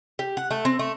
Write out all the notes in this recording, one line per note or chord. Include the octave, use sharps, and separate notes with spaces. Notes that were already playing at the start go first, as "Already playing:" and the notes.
G4
F#5
A3
C4
A3